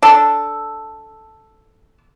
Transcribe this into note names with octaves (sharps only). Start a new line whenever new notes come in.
D4 A4